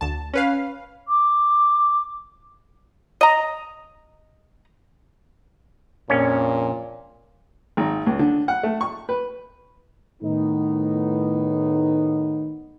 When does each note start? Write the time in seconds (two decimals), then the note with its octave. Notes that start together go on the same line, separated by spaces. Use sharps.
0.01 D2 A5
0.33 C#4 B4 F5
1.08 D6
3.21 D#5 A#5
6.10 A#1 F2 A#2 C#4
7.77 G#1
8.06 C#2
8.19 D3
8.48 F#5
8.63 A3
8.81 C#6
9.09 B4
10.22 A2 D#3 B3 D#4